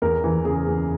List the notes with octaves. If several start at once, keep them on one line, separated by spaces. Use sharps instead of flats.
E2 A#4
E3
C#3 G#4
E2